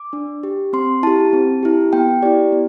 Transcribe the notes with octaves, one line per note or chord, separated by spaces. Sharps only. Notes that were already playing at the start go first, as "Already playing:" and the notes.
Already playing: D6
D4
G4
C4 C6
E4 G4 A5
C4
E4 G4
B3 G5
E4 G4 D5
B3